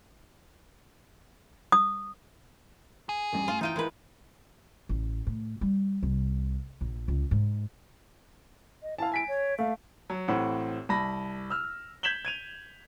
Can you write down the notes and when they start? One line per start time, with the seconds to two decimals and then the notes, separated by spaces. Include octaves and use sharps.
1.72 D#6
3.09 G#4
3.33 A1 G2
3.48 A3 F4
3.61 E3 D#4 F4 E5 G5 D#7
3.76 E3 G#3 E4 A#4 B4
4.89 A1
5.27 A2
5.61 G3
6.03 C2
6.81 A#1
7.08 C#2
7.31 G#2
8.82 D#5
8.99 E4 F5 A5
9.12 G#5 B6 D7
9.28 C#5
9.59 A3 F5
10.10 F#3
10.28 A1 A2 C4 F#5
10.89 C2 A5 B5 A#6
11.50 E6 F6
12.03 G6 G#6 B6 E7 F#7 G7
12.25 G#6 D#7 F7